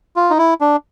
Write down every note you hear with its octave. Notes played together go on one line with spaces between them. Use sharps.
F4
D#4
E4
D4